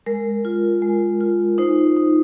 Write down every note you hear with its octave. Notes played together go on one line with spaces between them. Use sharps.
G#3 A#4
F4
G#3
F4
D#4 C5
D#4